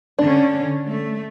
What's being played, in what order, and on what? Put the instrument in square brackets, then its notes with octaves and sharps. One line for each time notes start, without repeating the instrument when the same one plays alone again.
[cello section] D3 C#4 [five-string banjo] D4
[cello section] A3